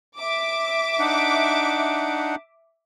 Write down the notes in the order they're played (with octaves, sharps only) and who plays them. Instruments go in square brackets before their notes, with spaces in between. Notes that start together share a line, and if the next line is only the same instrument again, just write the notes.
[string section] E5 D6
[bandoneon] D4 D#4 F#5